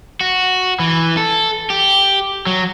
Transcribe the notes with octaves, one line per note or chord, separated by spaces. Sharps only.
F#4
E3
A4
G4
F#3